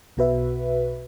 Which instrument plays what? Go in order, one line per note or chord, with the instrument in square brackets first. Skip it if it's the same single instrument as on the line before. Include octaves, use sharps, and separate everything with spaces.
[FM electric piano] B1 B2 F#4 B4 E5